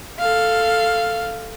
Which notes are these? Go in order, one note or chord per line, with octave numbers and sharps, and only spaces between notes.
A4 F5